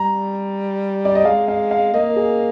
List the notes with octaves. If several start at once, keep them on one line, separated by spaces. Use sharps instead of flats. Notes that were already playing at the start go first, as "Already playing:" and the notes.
Already playing: G3 A#5
D5
D#5
G#3 F5
F5
F5
A#3 D#5
G#4